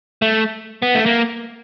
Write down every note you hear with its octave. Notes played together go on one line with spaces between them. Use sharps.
A3
B3
A3
A#3